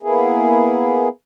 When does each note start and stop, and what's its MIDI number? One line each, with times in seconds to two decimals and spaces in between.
0.03 1.08 58
0.03 1.08 59
0.03 1.08 64
0.03 1.08 68